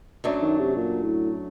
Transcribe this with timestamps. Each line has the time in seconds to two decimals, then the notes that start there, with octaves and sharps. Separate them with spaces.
0.24 F#2 F#3 A3 D4
0.42 D#3
0.60 C3
0.76 A#2
1.03 A2